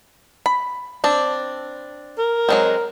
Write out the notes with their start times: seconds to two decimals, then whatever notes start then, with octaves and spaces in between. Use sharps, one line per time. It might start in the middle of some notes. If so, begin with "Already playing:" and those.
0.46 B5
1.04 C4 D4
2.19 A#4
2.49 F#3 G#3 C4